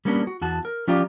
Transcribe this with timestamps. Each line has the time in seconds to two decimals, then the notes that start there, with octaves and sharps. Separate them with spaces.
0.05 G3 A#3 B3 C#4 D4
0.27 F#4
0.41 E2 F#4 A5
0.65 A#4
0.87 F3 C#4 F4 G4 D5 A#5